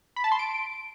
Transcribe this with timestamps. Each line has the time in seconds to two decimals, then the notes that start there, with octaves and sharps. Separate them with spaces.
0.16 B5
0.24 A5
0.32 C6
0.39 D7